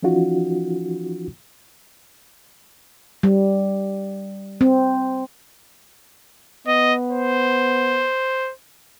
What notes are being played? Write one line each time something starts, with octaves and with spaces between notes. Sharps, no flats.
E3 F3 C#4 D#4 F4 F#4
G3
C4
B3 D#5
C5